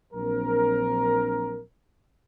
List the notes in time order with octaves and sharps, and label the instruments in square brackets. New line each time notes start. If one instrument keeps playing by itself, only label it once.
[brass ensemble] A#1 F#3 C4 D4 A#4